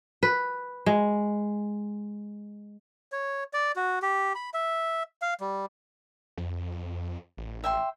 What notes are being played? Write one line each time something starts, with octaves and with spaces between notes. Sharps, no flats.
B4
G#3
C#5
D5
F#4
G4
B5
E5
F5
G3
F2
A1
E5 G5 C6